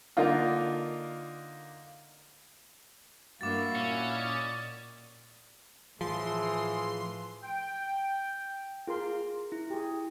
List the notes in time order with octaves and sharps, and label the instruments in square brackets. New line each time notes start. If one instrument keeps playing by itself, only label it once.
[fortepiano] D3 A#3 D4 D#4 F4
[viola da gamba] G2 A#3 [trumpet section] E4 F#4 F5 [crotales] D6 A6
[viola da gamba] A#2 [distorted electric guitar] C#4
[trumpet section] D5 D#5
[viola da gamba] A2 E3 [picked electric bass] F3 [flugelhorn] G#4 [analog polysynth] C6
[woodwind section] G5
[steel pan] F4 A#4 C6 [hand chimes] G#4
[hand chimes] E4
[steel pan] G4 G#4